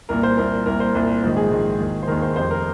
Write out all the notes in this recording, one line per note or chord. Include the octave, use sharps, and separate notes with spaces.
C2 A#2 A#4
C5
C2 A#2 A#4
C2 A#2 A#4
C5
C2 A#2
A#1 G#2 D#3 C5
G#4
A#1 G#2 D#3
D#2 D#3
C5
D#2 D#3 A#4
C5
F1 F2 C3 C5
A#4